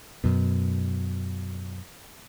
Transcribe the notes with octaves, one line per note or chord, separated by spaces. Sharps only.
F#2 B2